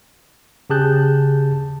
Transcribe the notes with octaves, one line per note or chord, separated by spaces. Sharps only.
C#3 G4 G#4 A5 F#6 G6